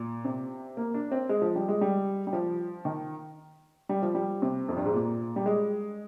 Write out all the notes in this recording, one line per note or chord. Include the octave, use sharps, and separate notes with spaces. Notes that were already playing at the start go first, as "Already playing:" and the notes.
Already playing: A#2
C3
A#3
D4
C4
G#3
F3
G3
G#3
G3
G3
F3
D#3
G3
F3
G3
C3
F2
G2
G#2
A#2
G3
G#3